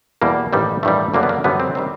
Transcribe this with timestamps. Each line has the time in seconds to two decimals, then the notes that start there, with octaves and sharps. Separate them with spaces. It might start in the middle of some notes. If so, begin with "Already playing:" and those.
0.22 E2 B2 G3 A#3
0.53 A1 G2 D#3 G3
0.83 A1 G2 D#3 G3 A3
1.14 F#2 D3 G3 A#3
1.23 B3
1.29 A#3
1.44 F#2 D3 G3 B3
1.60 C4
1.75 D#3 G3 C4